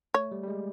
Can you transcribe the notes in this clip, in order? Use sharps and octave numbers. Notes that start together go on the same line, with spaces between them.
A3 C#5
G3
G3
G#3